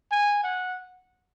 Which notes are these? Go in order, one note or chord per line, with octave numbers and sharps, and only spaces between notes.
G#5
F#5